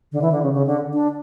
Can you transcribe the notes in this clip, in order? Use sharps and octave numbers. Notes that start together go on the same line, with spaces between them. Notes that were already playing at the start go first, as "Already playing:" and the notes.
D3
E3
D3
C#3
C#3
D3
D4